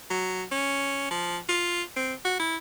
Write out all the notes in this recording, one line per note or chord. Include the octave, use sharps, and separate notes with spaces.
F#3
C#4
F3
F4
C4
F#4
E4